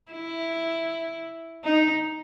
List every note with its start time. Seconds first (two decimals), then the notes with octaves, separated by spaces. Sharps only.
0.12 E4
1.64 D#4